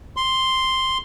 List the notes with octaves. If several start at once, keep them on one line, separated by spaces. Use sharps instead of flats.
C6